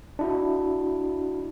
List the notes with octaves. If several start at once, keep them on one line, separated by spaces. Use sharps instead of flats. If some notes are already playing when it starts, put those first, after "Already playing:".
D4 E4 F#4